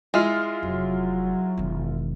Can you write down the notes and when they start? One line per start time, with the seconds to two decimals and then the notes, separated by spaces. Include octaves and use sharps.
0.14 G#3 E4 F4 F6
0.63 F1 F#3
1.58 E1 D#3